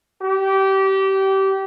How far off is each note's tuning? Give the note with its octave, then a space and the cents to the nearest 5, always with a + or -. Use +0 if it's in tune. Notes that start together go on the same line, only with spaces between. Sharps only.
G4 -25